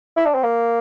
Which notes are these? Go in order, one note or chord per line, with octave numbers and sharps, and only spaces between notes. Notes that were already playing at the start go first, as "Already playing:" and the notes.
E4
D4
C4
A#3